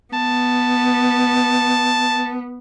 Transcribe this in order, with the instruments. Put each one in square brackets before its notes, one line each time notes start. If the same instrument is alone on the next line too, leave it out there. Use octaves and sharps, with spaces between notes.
[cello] B3 [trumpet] A5